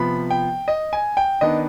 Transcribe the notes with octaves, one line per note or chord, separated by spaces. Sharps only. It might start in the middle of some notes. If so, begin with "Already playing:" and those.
Already playing: C3 F3 B3 B5
G5
D#5
G#5
G5
D#3 B3 D4 D#5